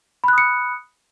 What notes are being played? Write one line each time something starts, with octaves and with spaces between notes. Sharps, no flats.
B5 D#6 F#6 C#7